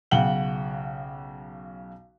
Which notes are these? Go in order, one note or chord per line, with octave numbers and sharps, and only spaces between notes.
B1 C#3 F#5 G5 F#7 G7